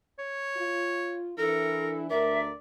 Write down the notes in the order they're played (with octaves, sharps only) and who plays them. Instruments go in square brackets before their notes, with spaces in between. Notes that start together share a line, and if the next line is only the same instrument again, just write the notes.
[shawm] C#5
[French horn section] F4
[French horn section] E3 D4 E4 [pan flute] A4 [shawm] A#4
[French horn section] D2 A#4 [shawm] D5 [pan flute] E5